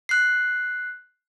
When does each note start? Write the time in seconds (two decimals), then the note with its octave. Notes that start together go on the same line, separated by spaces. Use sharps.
0.09 F#6 C7